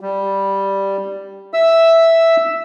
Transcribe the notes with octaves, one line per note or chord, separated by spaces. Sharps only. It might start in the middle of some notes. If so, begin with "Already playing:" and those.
G3
E5 E6